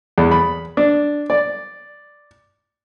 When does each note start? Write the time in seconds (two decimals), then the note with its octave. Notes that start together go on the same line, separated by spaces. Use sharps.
0.18 E2
0.31 B5
0.77 D4
1.30 D5